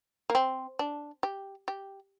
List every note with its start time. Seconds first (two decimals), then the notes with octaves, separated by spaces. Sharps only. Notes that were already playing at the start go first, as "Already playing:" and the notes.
0.30 A#3
0.35 C4
0.79 D4
1.23 G4
1.68 G4